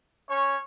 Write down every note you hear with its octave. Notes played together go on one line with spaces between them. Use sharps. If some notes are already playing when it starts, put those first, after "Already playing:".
C#4 C#5